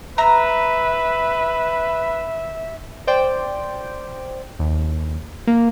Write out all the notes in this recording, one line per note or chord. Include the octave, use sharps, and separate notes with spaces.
B4 E5 A#5
C5 D5 G5
D#2
A#3